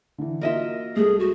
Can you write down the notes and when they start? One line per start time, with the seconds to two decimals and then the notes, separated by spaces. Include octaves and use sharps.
0.18 D3 E3
0.41 F#3 A#3 F4 A#4 D#5 E5
0.96 C2 G#3 G#4 A4
1.19 F#4